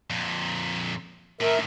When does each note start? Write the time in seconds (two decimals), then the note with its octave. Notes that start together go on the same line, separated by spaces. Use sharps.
0.10 F2 A#2
1.41 A2 D#3 A#4 E5